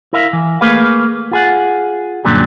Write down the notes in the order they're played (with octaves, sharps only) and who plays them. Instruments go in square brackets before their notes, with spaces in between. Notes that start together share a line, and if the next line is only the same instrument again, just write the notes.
[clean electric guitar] E4 A#4 E5 F5
E3
A3 A#3 G#4 B4 F5
F4 G#4 F#5
F#2 A#2 D3 F#3 G3